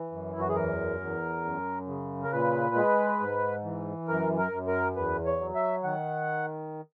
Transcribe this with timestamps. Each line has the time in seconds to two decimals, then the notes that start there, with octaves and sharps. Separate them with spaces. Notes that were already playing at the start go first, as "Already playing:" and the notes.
Already playing: E3
0.12 F#2
0.33 E4
0.40 F#4
0.49 G#4
0.55 E2 A#4
1.00 E2
1.44 F#2
1.87 C#3
2.23 A#4
2.32 A#2 B4
2.75 G#3
3.20 G#2
3.64 E3
4.08 F#2 A#4
4.38 A#4
4.52 F#2
4.68 A#4
4.96 E2 B4
5.26 C#5
5.40 F#3
5.55 E5
5.84 D#3 F#5